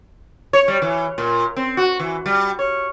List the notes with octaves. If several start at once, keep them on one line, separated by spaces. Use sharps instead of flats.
C#5
G3
E3
A#2
C4
F#4
E3
G3
C#5